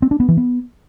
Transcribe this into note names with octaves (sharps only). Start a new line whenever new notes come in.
C4
D4
B3
E3
B3